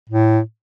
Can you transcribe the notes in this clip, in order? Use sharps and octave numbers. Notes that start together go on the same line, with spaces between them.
A2